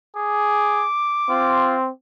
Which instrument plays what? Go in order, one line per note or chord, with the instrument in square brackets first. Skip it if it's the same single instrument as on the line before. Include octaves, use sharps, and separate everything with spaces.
[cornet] G#4 [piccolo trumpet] D6
[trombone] C4 [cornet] F4